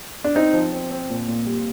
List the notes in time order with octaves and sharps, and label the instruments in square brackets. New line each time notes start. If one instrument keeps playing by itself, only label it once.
[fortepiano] D4
[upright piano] C4 [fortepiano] D#4
[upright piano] F3
C4
C4
A#2
A#2
G3